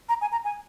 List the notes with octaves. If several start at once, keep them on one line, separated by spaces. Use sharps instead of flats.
A#5
G#5
A#5
G#5